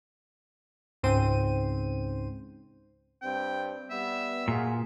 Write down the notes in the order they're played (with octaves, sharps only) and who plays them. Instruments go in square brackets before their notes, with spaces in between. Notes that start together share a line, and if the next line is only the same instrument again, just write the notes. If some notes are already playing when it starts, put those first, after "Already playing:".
[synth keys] C#2 G#2 C#3 C4 C5 D#7
[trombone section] G2 C4 [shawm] G5
[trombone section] G3 B3 [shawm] E5
[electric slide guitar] A#2 [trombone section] F4 F#4 G#4